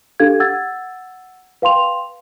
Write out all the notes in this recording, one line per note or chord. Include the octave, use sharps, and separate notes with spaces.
D4 G4 A4 F5 G#6
F#5 E6 G#6 A6
B4 F5 G5 C6 F7